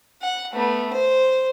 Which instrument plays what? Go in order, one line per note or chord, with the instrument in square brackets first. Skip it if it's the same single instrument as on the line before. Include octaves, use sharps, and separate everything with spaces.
[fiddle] F#5
A3 B3
C5